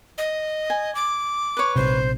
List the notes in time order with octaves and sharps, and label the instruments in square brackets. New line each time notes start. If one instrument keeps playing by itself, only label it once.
[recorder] D#5
[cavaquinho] G#5
[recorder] D6
[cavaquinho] B4 C#5
[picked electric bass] A#1 C3 [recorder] C5